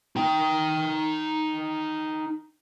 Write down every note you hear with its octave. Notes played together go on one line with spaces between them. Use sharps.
D#4 G5